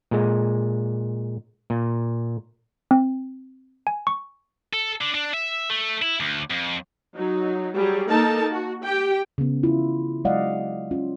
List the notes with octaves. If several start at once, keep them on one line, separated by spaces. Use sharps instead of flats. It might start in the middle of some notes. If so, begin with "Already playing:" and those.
A#2 G#3
A#2
C4
G#5
C#6
A4
D3
D4
E5
A3
E4
D2
F2
F#3 D#4
F#3 G3 G#4
A#3 D#4 A4 A#4 A5
F#4
G4 G5
C#3 B3
E4 F4
F#3 G#3 D5 D#5 F5 F#5
C#4 F4